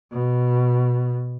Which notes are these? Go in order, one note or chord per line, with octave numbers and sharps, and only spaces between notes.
B2